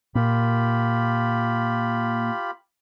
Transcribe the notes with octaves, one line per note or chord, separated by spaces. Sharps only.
A#2 F4 G4 B5